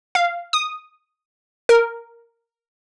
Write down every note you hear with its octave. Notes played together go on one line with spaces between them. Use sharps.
F5
D#6
A#4